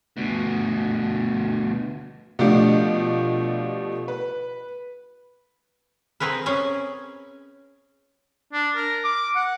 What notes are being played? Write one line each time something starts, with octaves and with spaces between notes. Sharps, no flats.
D2 B2
B2 F3 A3 D4 F4 G4
B4
C4 G#4 A#4 B4
C#4 G#4 G#5
D4
A#4
D6
F#5